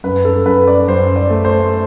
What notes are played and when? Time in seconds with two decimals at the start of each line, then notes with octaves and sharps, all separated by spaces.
0.04 F#2 B4
0.25 A4
0.45 F#2 B4
0.68 D5
0.88 F#2 C5
1.16 D5
1.30 A3
1.45 C5